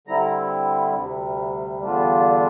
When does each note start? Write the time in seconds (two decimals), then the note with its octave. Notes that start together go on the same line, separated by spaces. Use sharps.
0.07 D3 G3 C4 E4 A#5
0.95 D2 C3 G3
1.82 E2 D3 G3 D4 F4